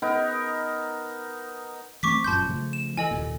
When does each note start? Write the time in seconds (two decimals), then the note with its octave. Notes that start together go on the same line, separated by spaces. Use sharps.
0.02 B3 D#4 A#4
2.03 E3 A3 C4 C#6 D6 B6
2.24 G1 F#2 A#2 A5 C6 G6
2.48 C#3 F3 A3
2.73 E7
2.97 E3 A4 D#5 G#5
3.11 F1 D#2 A#2